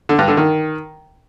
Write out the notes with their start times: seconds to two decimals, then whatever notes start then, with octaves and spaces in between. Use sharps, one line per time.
0.09 D3
0.19 G2
0.28 D3
0.37 D#3